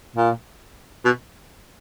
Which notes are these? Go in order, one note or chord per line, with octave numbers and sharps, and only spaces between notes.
A#2
B2